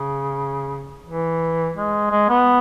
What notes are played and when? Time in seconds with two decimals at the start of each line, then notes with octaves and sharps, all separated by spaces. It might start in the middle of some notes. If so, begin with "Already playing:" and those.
Already playing: C#3
1.06 E3
1.76 G#3
2.11 G#3
2.29 B3